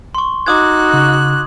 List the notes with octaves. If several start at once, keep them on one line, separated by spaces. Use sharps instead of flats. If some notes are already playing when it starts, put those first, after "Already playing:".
C6 C#6
D#4 F#4 D6 D#6 F#6 G#6
C#3